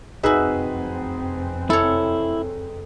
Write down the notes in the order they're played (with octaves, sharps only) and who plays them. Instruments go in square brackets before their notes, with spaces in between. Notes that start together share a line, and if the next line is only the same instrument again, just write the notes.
[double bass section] F1 F#2 C4 [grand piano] D#4 G#4 B4 [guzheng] F#4 E5
[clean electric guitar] E4 [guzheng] A4 C#5